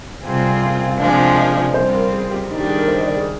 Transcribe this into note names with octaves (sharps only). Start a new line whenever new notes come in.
C3 G3 C4 F4 G#4 G5
G5
G#5
G5
G5
F5
C3 F3 G#3 D4 F5
G#5
G5
F5
D#5
D5
G3 C4 F4 C5
A#4
G#4
G4
D#3 G3 D4 D#4
G4
G#4
A#4
C5
D#5
D5
G#4